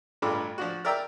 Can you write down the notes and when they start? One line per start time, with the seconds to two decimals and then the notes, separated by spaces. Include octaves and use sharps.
0.22 A1 G2 D4 F4 A4 D6
0.58 F3 D4 F#4
0.85 A#4 D5 E5 G5 A#5 E6